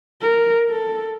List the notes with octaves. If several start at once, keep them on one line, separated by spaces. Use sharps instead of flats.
A#4
A4